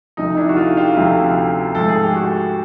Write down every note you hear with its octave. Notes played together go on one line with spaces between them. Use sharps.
D2 C3 F3 A3 D#4
D4 E4
F#4
D#4 F4
F4 G4
D2 C3 F3 A3
G#2 F3 A3 A4
G#4
G4
F#4 G#4